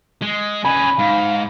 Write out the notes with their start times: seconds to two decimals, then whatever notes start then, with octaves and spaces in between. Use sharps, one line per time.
0.22 G#3
0.64 C#3 B4 G#5 B5
0.99 G#2 F5